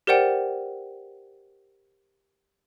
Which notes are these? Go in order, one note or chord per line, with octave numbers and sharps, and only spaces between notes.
G4 A#4 C5 D5 F#5 G5